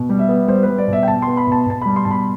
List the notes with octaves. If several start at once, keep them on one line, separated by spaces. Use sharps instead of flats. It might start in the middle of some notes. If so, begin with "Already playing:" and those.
Already playing: B2
G3
E5
B3
G3 C5
B4
G3
D5
B2
E5
G5
B2 A5
B3 C6
B5
B2 A5
B2 A5
G3 B5
C6
B2 A5
B5